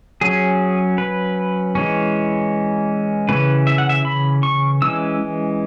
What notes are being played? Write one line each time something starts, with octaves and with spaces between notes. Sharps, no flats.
F#3 C#4 G#4
B4
E3 G#3 C#4
C#3 E3 C#4 B4
E5
F#5
E5
B5
C#6
E3 G#3 C#4 E6